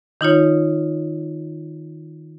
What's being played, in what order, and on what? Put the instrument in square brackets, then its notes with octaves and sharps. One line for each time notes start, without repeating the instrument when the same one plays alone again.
[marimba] D#3 D#4 F4 C#5